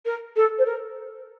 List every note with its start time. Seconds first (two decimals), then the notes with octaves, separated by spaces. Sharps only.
0.05 A#4
0.36 A4
0.58 C5
0.65 A#4